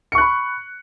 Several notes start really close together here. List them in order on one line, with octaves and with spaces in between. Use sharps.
C#7 C#6 F#6 B5